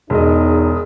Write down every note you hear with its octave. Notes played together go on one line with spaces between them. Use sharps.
E1 E2 G#3 D#4 G#4 D#5